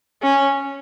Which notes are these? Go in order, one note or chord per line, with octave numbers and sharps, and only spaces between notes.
C#4